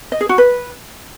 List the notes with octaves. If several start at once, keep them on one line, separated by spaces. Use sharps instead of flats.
D#5
G#4
F#4
B4